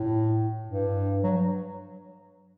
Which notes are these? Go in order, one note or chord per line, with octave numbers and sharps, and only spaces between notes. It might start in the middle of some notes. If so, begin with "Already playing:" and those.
Already playing: A2
G2
F#3